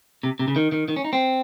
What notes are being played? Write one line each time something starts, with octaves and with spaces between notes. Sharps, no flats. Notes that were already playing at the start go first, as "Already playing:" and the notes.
C3
C3
C#3
D#3
D#3
D#3
C#4
D#4
C4